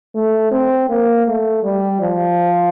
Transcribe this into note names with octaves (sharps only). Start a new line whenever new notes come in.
A3
C4
A#3
A3
G3
F3